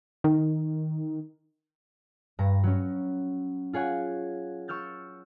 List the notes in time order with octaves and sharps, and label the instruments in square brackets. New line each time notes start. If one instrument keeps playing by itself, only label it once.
[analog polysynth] D#3
[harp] G2 A#5
F#3 C#4
F4 G#4 C#5 F#5 G#5
C#6 E6 F6 G6 A6